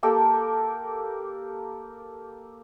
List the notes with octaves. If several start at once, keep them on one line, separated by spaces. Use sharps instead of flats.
A#3 G4 A4 A#4